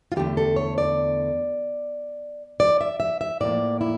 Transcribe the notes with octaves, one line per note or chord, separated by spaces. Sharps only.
F4
E2 D3 A3 G4
A4
C#5
D5
D5
E5
E5
E5
A2 F3 A#3 D5
E4